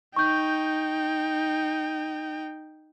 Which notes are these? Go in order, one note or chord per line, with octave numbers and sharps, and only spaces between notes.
D#4 G5 C#6 G6